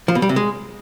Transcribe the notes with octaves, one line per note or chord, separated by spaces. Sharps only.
F3
B2
G3
C3
G#3